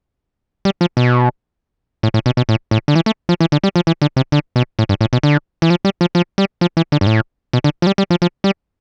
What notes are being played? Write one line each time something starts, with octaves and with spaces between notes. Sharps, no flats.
G3
F3
B2
A2
A2
B2
B2
A2
A2
D3
E3
A3
F3
E3
D3
G3
F3
E3
D3
C3
D3
B2
A2
G2
A2
B2
D3
E3
F3
G3
F3
F3
G3
F3
E3
D3
G2
A2
B2
D3
F3
G3
G3
F3
F3
G3